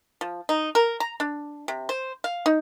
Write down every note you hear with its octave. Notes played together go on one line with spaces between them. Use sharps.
F3
D#4
A#4
A#5
D4
C3
C5
F5
D#4